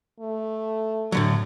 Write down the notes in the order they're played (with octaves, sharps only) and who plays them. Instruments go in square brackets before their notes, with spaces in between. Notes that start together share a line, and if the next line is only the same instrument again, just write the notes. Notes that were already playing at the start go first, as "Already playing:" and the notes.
[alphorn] A3
[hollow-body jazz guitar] A2 D3 F#3